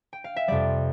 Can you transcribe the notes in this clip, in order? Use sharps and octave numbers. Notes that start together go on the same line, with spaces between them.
G5
F5
E5
F2 C3 G3 D5